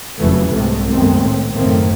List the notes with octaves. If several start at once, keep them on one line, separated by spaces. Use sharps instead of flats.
F1 E2 C#3 E3 F#3 A3
C2 G#2 C3 G#3 A3
F#2 D#3 G#3 A3 B3 C4
A2
F#1 A2 D#3 A3 A#3 C4